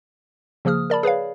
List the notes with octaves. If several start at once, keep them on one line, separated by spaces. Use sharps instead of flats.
C#3 F3 A#3 G#4 D#6 F6
A#4 D5 A5 B5
G#4 B4 C#5 F5